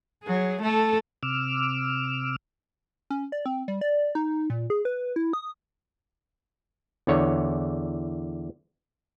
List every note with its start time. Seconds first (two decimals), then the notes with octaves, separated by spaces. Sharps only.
0.23 F#3 G#4
0.62 A3 A4
1.23 C3 D6 E6 F6
3.10 C#4
3.32 D5
3.46 C4
3.68 G3
3.81 D5
4.15 D#4
4.50 A#2
4.70 G#4
4.85 B4
5.16 E4
5.33 D#6
7.07 E2 D3 C#5